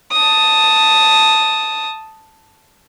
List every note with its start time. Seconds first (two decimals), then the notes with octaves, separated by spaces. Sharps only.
0.12 A5 D#6